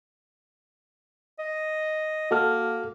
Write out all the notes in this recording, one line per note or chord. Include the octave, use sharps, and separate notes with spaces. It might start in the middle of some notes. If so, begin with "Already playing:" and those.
D#5
A#3 F#4 A4 F6